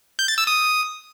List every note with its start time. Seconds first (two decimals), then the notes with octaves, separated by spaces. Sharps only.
0.19 G6
0.28 A6
0.38 E6
0.47 D#6